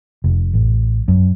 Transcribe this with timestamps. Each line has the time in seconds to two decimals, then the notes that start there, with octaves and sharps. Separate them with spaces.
0.24 F1
0.54 A1
1.08 F#2